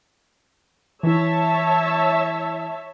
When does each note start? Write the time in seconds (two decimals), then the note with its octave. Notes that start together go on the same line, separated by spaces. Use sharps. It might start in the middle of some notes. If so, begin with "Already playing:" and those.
1.03 E3 E4 C#5 E5 A5